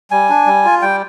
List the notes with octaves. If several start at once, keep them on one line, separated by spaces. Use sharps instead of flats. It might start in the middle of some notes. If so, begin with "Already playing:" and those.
G3 G#5
D4
G3
F4
G3 G5